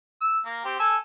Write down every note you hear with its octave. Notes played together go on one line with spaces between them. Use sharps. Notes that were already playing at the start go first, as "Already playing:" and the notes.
E6
A#3
C4 G4
A4 G#5 E6